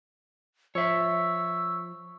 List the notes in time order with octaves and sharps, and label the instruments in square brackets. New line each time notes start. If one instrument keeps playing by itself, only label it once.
[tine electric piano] F3 [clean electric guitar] C#5 E5 [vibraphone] C#6 [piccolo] E6